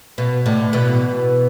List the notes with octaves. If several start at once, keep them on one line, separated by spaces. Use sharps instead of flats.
B2
A2 D3
B2 E3